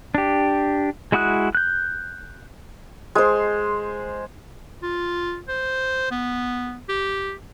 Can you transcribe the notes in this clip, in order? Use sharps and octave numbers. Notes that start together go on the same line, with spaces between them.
D4 G4
G#3 E4 F#4 D#6 F#6
F#6 G6
G#3 C5
F4
C5
B3
G4